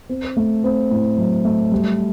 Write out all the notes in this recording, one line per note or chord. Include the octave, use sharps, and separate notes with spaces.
C4
A3
C4
A2
F#3
A3
G3